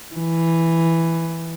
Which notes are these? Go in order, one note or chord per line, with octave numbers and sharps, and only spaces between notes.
E3